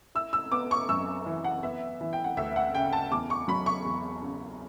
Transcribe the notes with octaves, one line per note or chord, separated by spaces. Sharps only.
E4 E6
E6
B3 D6
C#6
F#2 E6
E3
F#5
B3 E5
E3
G5
F#5
D2 E5
F#5
C#3 G5
A5
E2 D6
C#6
F#3 B5
C#6
E2
C#3